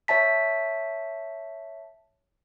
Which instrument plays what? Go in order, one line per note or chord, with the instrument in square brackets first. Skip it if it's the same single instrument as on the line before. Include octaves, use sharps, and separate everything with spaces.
[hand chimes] C#5 E5 A5 B6